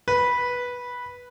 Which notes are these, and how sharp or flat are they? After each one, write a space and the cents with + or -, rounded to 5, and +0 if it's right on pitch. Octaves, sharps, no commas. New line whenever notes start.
B4 -10